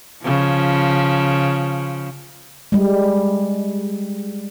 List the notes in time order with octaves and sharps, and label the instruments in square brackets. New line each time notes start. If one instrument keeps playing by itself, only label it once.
[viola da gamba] C#3 F3
[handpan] G3 G#3